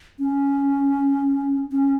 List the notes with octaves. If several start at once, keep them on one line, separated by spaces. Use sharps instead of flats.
C#4
C#4